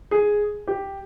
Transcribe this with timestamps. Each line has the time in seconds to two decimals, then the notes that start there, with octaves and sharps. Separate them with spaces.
0.11 G#4
0.67 G4